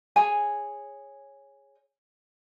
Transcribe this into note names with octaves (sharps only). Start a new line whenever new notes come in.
G#4 C#5 G#5